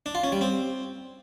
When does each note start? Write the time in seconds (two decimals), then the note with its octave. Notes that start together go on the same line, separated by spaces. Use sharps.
0.06 D4
0.15 F4
0.24 C#4
0.32 G3
0.41 C4